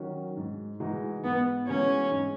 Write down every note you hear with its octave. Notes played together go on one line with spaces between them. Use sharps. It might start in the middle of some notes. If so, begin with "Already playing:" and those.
Already playing: D#3 F#3 C#4 F#4
G#2
E3 G#3 D#4 F#4
G#2 B3
E3 G#3 C#4 D#4 F#4
G#2